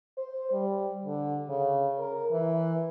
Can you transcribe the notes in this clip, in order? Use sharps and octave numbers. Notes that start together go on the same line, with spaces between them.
C5
G3
D3
C#3
A#4
E3